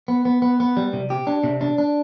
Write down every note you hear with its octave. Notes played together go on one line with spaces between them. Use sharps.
B3
B3
B3
B3
G3
C3
G4
D4
C3
D4
D4